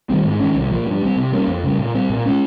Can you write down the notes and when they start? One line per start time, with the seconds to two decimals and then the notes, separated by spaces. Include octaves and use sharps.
0.10 D#3 G3 C4
0.24 G#2
0.40 D#3 G#3 C#4
0.55 C2
0.71 A#2 F3 A#3
0.86 G2
1.02 G3 C4
1.17 C3
1.32 G3 A#3 C#4
1.48 F2
1.64 C#3 G3
1.79 A#2
1.95 G3 C4
2.10 A#2
2.26 G#3 C#4